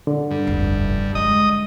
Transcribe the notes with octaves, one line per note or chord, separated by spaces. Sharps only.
D3
G2
F1 C2
G3 G#3 D#5 D#6